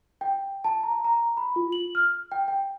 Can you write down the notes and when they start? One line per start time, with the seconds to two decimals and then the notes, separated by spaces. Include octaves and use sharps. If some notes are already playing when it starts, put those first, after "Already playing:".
0.21 G5
0.64 A5
0.83 A#5
1.04 A#5
1.37 B5
1.56 F4
1.72 F#7
1.95 F6
2.32 G5
2.48 G5